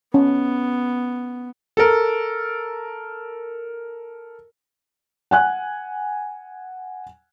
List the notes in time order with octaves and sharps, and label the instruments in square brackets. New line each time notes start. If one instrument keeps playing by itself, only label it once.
[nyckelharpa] B3 [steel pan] C#4
[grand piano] A4 A#4
[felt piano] F#5 G#5 F#6